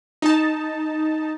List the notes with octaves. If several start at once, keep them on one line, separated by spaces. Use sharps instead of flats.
D#4 A5